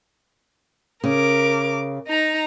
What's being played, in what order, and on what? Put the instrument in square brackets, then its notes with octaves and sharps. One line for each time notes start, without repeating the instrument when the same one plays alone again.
[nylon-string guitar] C#3 [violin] A#4 D6
[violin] D#4 A#5